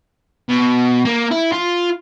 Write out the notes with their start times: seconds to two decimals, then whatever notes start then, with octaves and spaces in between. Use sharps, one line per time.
0.49 B2
1.05 A#3
1.31 E4
1.52 F4